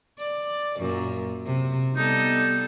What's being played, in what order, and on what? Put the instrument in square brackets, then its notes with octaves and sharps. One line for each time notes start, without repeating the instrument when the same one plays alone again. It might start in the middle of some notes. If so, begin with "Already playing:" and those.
[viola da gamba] D5
F#2 A#2
C3
[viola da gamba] G3 B3 A4 [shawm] D#4